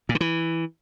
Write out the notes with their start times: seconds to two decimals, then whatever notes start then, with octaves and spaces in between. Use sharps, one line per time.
0.09 A#2
0.15 D3
0.21 E3